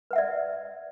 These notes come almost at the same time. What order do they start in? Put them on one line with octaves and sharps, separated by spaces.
B4 F#5 E5 D5